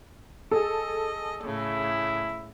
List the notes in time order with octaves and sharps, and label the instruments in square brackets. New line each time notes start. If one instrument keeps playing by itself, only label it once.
[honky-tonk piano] G#4 A4 [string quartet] D#5
[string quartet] A2 C#3 [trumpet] E4